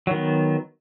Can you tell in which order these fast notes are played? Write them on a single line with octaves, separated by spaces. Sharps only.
F#3 D#3 B3